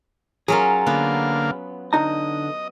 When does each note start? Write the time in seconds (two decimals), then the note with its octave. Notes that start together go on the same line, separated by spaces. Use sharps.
0.48 F#3 C#4 F4 G#4 A#4
0.87 D3 A#3 B3 F5
1.93 D3 D#4 D#5 A#5